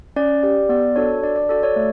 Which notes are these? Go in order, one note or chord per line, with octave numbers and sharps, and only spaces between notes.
C#4 D5
G4 D5
B3 D5
D4 F#4 A4 C#5
D4 D5
D5
F#4 A4 D5
C#5
A3